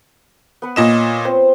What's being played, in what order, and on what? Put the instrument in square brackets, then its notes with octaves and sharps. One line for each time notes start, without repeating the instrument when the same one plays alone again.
[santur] B3 B4 F#5
[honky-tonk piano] A#2 D#5 E7 [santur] F4 C#5
[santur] B3 C4 C5